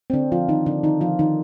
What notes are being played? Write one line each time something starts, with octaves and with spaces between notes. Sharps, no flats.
C4
D3 D4
F3 F4
D#3 D#4
D3 D4
D#3 D#4
F3 F4
D#3 D#4